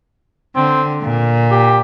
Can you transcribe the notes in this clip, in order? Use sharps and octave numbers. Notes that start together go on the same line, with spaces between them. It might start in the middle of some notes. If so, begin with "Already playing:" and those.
D3 C4
A#2
G4